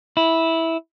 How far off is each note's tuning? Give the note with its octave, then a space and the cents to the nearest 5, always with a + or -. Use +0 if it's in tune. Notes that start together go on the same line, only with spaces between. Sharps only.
E4 -10